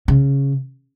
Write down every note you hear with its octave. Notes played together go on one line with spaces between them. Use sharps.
C#3